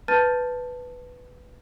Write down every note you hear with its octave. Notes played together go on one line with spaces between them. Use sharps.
B4 A5 F6 G6 A6 D#7